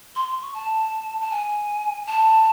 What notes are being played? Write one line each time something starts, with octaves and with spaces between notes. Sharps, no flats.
C6
C6
C#6
A5
A5
G#5
A5